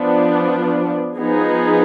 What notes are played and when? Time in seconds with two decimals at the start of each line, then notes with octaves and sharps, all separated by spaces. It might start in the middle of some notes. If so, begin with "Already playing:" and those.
Already playing: F3 B3 D4
1.16 F3 B3 D#4 G#4